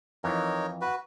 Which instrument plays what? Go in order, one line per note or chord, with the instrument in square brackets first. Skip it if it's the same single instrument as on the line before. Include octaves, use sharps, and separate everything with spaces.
[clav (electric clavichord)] F2 E3 [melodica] D#4 A#4 C#5
[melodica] F#4 B4